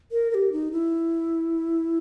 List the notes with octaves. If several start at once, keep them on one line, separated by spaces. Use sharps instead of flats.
A#4
A#4
G4
D#4
E4